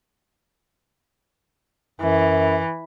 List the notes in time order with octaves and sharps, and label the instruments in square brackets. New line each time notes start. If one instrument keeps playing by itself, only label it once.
[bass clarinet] F#2 [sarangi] E3